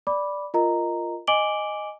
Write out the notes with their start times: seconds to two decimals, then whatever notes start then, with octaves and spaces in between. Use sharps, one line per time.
0.07 D5 B5 D6
0.54 F4 A#4 D#5 A#5
1.27 D#5 G#5 D6 D7 F#7 G7